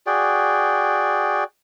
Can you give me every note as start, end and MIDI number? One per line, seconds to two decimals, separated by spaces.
0.07 1.44 66
0.07 1.44 68
0.07 1.44 74
0.07 1.44 79